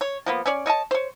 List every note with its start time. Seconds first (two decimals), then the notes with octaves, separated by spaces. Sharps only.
0.01 C#5
0.26 F3 A#3 B3
0.46 C#4 C#5 D5
0.66 C#5 D#5 E5 A5
0.91 C5 C#5